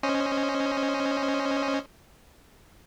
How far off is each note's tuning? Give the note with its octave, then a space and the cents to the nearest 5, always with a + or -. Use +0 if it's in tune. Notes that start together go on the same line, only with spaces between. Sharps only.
C#4 +0 C5 +0 D#5 +0